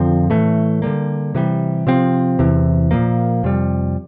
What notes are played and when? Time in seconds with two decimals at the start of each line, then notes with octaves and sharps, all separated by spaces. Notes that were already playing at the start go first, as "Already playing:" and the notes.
Already playing: F2 D3 F3 C4
0.30 A2 E3 A3
0.82 D3 G3 A#3
1.35 C3 E3 G3
1.87 C3 F3 C4
2.39 E2 C3 E3
2.91 A#2 F3 A#3
3.43 F2 C3 G3